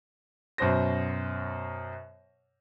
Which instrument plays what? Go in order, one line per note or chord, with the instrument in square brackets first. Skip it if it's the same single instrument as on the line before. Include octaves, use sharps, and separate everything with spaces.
[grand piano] F#2 B2 C5 A#6